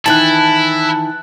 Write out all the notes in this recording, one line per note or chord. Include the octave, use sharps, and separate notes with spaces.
D#3 E3 E4 A5 F#6